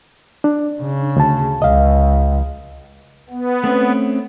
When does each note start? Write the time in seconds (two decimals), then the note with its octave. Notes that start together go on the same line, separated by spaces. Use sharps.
0.44 D4
0.82 C#3
1.16 D2 A5
1.62 C#2 D#5 F5
3.30 B3
3.64 A3 C4 C#4